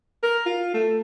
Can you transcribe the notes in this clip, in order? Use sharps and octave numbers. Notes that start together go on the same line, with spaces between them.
A#4
F4
A3